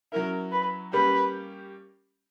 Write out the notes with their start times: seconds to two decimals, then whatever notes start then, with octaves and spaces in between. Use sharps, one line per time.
0.12 F#3 C#4 E4 A#4
0.52 B4
0.93 G3 A#3 C#4 G4 B4